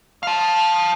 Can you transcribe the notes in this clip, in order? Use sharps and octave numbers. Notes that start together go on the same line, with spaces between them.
F5 A5